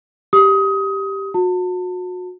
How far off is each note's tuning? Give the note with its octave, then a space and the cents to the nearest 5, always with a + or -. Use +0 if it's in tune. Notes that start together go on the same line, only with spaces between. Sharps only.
G4 +0 D#6 +20
F#4 -30 A5 +40